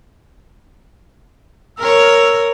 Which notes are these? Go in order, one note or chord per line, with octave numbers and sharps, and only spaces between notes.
A#4 C#5 E6